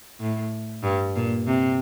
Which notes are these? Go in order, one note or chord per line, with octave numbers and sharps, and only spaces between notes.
A2
G2
A#2
C3